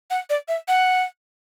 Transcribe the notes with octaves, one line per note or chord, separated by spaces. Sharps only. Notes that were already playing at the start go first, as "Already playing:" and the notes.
F#5
D5
E5
F#5